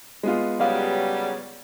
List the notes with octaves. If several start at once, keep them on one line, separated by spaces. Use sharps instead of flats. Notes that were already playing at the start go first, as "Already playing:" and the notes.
G#3 B3 F4
C#3 F#3 G3 G#4 B4 F5